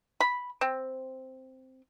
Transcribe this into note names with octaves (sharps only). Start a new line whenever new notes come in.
B5
C4